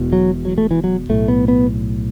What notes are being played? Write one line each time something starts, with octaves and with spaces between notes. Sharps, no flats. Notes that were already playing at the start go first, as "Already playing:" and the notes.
Already playing: E1 E2 B2
F#3
F#3
A3
E3
F#3
B1 A2 A3
B3
B3